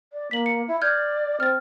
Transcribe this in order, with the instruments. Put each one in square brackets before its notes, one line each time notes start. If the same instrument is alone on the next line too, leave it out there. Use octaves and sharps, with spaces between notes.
[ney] D5
[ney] A#3 [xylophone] B6 F#7
[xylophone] C#7
[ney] E4
[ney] D5 [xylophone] F6 G6 G#6
[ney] C4 [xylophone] F6 A6